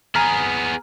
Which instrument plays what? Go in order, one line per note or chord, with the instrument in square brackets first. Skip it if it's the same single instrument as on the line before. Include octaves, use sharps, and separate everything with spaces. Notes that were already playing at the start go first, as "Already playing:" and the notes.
[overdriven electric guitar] B3 G#4 [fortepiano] G#5 A#5 F6